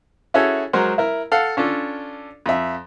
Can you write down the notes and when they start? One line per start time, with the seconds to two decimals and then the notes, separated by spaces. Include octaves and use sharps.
0.34 C#4 E4 F#4 G#4 A4 C#5
0.73 F#3 G#3 A#4 C5 F#5
0.98 E4 A#4
1.32 A4 F5 F#5
1.57 C#4 D4 F4 A4
2.46 F2 E5